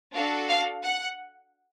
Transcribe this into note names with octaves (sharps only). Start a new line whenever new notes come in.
D4 F#4 A4 F5
F5
F#5